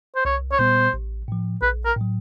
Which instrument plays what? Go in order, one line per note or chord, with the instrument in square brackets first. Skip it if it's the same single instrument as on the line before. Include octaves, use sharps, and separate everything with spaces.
[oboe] C5
[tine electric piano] C2 [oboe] C#5
[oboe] C#5
[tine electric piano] A#2 G3 B3 [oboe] C5
[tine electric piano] A1
A2 F3
[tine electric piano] A#1 [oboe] B4
[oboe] A#4
[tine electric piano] A2 F#3